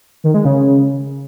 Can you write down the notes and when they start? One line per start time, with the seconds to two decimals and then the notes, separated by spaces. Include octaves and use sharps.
0.24 D#3
0.34 G#3
0.45 C#3